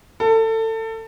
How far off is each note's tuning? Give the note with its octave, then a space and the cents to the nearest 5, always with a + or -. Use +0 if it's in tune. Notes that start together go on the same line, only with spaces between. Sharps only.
A4 +25